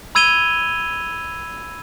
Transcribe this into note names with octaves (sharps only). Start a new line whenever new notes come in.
B5 E6 G#6 D#7 F7 G7